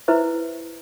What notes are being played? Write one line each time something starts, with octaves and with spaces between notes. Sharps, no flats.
E4 B4 C5 E5